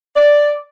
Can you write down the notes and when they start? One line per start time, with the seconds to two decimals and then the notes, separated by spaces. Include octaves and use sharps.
0.16 D5